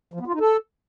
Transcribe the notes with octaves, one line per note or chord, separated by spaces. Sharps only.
F3
B3
F4
D#4
A4